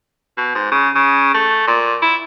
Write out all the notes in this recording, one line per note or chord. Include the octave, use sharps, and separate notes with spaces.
B2
G#2
C#3
C#3
A3
A#2
E4